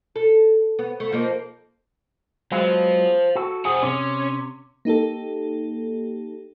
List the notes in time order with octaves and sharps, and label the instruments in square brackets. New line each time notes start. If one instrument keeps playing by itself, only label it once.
[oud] A4
B3
A3
F3 A#3 D#4
[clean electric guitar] F#3 G#3 B3 [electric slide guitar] C5 F5
[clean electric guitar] F#4 A4
[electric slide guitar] F2 C5 F#5 [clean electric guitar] G#4
[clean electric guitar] C3 [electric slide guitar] C#4
[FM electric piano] A#3 D#4 G4 A4